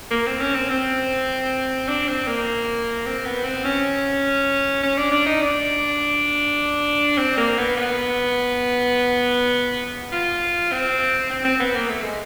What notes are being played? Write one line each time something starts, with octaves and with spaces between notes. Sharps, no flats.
A#3
C4
C#4
C4
C4
D4
C4
A#3
C4
B3
C4
C#4
C#4
D4
D4
D#4
D4
C4
A#3
B3
B3
F4
C4
C4
C4
B3
A#3
A3
G#3